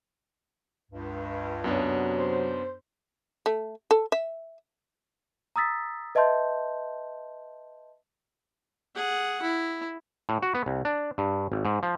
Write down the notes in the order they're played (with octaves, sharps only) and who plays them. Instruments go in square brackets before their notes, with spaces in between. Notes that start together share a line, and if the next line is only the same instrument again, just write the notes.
[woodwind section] C#2 G2
[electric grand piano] F#2 B3 D4 [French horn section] C3 F#3 C#5
[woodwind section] C5
[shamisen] A3
A4
E5
[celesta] A#5 D#6 E6 A6 B6
B4 D#5 E5 A5 C6 G6
[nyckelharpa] G#4 F#5
E4
[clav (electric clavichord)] A2
F#4
B3
C2
D4
G2
G#1
G#2
F3